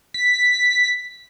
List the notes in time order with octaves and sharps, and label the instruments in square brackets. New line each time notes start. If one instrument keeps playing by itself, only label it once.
[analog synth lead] B6